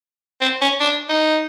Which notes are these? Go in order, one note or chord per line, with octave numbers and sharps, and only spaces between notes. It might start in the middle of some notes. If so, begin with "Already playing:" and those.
C4
C#4
D4
D#4